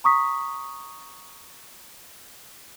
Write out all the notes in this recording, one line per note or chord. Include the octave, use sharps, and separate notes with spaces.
A#5 C#6 D#6 B6